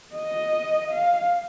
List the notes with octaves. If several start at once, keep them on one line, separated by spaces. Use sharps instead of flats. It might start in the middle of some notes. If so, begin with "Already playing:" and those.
D#5
F5